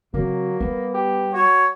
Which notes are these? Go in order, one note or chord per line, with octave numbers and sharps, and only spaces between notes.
C#3 F#3 A#3 C4
G3 B3
G4
F#4 C#5